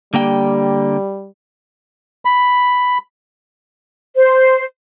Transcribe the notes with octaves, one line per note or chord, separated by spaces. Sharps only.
D3 G3 A#3 G5
B5
C5